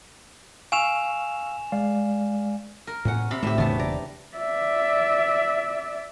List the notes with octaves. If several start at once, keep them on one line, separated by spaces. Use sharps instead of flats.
F5 G#5 C#6 E6 E7 F7
G#3 D5 F5
A#4
E2 A2 C#4 F#5
C3 B5
D2 A2 A3 D#4 G4 E5
E1 C#3 E3 B3 A5
D5 A#5
D5 E5